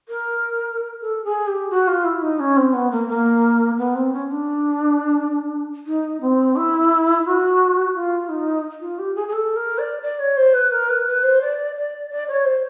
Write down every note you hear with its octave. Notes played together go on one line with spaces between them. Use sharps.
A#4
A4
G#4
G4
F#4
F4
E4
D#4
C#4
C4
B3
A#3
A#3
B3
C4
C#4
D4
D#4
C4
E4
F#4
F4
D#4
F4
G4
G#4
G#4
A4
A#4
D5
D5
C#5
C5
B4
A#4
B4
B4
C5
D5
D5
D5
C#5
C5